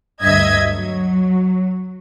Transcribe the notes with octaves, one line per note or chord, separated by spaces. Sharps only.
D2 G2 D#5 E5 G#6
F#3